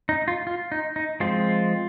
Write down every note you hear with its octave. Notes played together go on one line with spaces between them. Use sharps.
D#4
F4
F4
D#4
D#4
F3 G#3 C4 F4